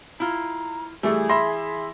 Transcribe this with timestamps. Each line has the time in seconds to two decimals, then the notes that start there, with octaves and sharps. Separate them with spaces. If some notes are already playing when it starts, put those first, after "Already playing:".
0.20 E4 F4 A#5
1.03 E3 G3 A3 G#4
1.29 E5 B5 C6 A#6